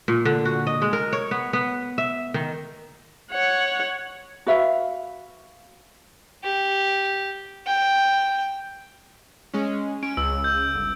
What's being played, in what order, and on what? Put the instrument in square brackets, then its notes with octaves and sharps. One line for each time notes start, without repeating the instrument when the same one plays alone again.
[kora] A#2
D3
F#4
D#5
G#3
A#4
C#5
B3
B3
E5
D#3
[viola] C#5 F#5
[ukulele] F#4 B4 E5 F5
[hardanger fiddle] G4
G5
[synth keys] G#3 C#4
[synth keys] C#4 [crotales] D7
[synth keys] C#2 [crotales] E6
[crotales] G6
[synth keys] G1